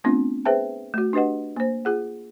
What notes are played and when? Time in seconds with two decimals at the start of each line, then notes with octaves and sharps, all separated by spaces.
0.04 A3 B3 C4 D4 F4
0.45 G#4 B4 C5 E5 G5 A5
0.94 A3 F#4
1.13 D4 G4 B4 D#5 F#5
1.56 A#3 C5
1.85 F4 G#4 F#5